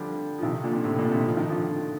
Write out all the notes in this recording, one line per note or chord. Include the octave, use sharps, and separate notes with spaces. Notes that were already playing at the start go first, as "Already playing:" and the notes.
Already playing: D3 F3 G3
F3
C3 D#3
A#2 D3
A2 C3
A#2 D3
C3 D#3
F3
D#3
D3 F3